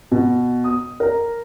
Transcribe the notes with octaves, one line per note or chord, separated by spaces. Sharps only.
B2
D#6
A#4